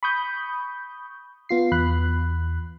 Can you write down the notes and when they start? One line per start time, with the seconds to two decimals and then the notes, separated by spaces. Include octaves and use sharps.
0.03 B5 C#6 D#6 G6
1.49 B3 F4 C7
1.71 E2 B5 F#6